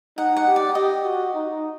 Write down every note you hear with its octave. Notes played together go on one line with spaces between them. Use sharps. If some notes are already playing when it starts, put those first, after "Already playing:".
D#4 F#5
F#5
G4
D5
G4 D#5
F#4
D#4